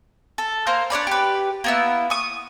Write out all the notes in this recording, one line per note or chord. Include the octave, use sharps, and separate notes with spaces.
A4
A#3 A#4 C5
D4 C#5 D5 B5
G4 B4
A#3 B3 E4
C#6 D#6